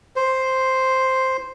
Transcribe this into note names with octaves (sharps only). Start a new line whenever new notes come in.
C5